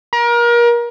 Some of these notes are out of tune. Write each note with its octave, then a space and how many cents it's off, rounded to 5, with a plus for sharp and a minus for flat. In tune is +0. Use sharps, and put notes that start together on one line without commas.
A#4 +30